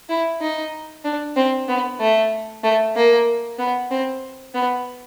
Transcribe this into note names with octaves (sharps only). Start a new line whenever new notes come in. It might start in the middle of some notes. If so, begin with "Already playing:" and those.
E4
D#4
D4
C4
B3
A3
A3
A#3
B3
C4
B3